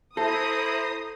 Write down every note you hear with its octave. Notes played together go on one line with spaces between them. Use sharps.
E4 A4 C5 A#5 D#6